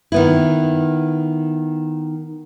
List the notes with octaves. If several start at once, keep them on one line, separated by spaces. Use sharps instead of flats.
D#3 B3 E4